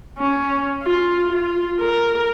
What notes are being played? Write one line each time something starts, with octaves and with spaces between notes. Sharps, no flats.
C#4
F4
F4
A#4